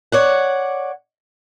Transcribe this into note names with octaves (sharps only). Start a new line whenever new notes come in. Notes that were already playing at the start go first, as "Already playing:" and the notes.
C#5 D5 F#5